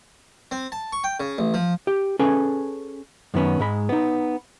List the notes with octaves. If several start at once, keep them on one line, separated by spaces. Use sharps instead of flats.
C4
A5
C#6
G5
C#3
A1
F3
G4
C#4 G#4 A4 B4
F#2 D#3 B3 C#4
G#2 G#3 B5
B3 D#4